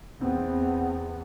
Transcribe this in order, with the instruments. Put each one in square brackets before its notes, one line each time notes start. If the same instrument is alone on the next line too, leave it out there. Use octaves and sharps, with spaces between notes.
[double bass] E2 B3 [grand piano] C4